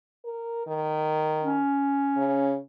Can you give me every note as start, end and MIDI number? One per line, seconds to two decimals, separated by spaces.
0.24 0.67 70
0.67 1.60 51
1.43 2.61 61
2.17 2.55 49